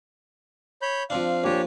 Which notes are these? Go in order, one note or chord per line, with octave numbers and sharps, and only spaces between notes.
C#5 B5 G6
F3 C4 D4 F5
A#1 F3 D4 G4 C#5